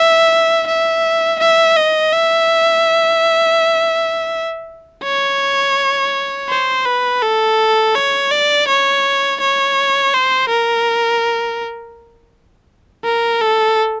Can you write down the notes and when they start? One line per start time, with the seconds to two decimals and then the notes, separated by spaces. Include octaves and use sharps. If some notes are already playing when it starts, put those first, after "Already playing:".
Already playing: E5
0.67 E5
1.40 E5
1.77 D#5
2.13 E5
5.04 C#5
6.49 C5
6.86 B4
7.22 A4
7.95 C#5
8.31 D5
8.68 C#5
9.40 C#5
10.14 C5
10.49 A#4
13.04 A#4
13.41 A4